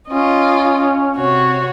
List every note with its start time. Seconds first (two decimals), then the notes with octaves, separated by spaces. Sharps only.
0.10 C#4 F4 D#5
1.16 C3 F#4 C#5